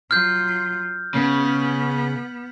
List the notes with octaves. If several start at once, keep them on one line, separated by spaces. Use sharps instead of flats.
F#3 F4 F6 G6
C#3 B3